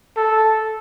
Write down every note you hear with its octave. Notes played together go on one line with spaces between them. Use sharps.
A4